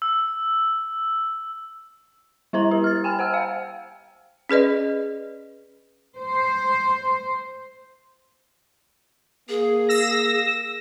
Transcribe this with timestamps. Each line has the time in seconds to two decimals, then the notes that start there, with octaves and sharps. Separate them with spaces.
0.02 E6
2.53 G3 E4 C5 A#5
2.71 G4
2.84 F6 A6
3.04 G5 G#5 F6
3.19 C5 F#5 E6 F6
3.33 F5 G5
4.49 C#4 G#4 B4 D5 D#5
6.18 C5
9.49 A#3 G#4
9.89 E6 A#6